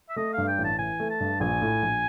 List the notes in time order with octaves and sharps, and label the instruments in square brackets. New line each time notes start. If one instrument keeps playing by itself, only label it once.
[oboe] E5
[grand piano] A3 [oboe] D#5
[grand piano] G2 [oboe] F5
[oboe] G5
[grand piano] A1
[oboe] A5
[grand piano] E3 [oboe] G#5
[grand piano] A3
[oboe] A5
[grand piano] G2
[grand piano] A#1 [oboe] G#5
[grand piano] A2
A#1